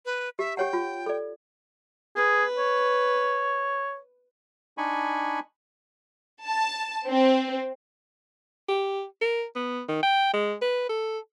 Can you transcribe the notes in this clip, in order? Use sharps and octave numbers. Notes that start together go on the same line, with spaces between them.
B4
G4 E5
G4 C#5 F#5 G5
F4
A4 D5
G#4 B4
C#5
D4 D#4 G#5 B5 C#6
A5
C4
G4
A#4
B3
D#3
G5
G#3
B4
A4